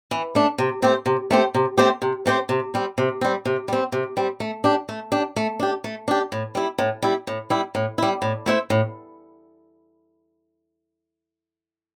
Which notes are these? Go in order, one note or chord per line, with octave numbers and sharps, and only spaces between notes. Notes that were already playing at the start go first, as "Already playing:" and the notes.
E3
A3 D4
C3
A3 C4 G4 C5
C3
A3 C4 G4 C5
C3
A3 C4 G4 C5
C3
A3 C4 G4 C5
C3
G3 C4
C3
G3 C4
C3
G3 C4
C3
G3 C4
A3
D4 G4
A3
D4 G4
A3
D4 G4
A3
D4 G4
A2
G3 E4
A2
G3 E4
A2
G3 E4
A2
G3 E4
A2
A3 E4 C5 E5
A2